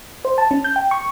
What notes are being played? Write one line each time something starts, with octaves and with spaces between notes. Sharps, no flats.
C5
A5
C#4
G6
G5
C#6